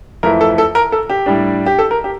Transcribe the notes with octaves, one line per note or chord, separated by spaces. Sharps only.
F2 E3 A3 E4 A#4
A4
A4
A#4
A4
G4
A2 G3 D4
G4
A4
A#4
G4